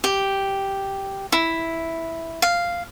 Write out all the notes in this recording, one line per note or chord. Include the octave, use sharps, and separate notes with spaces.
G4
E4
F5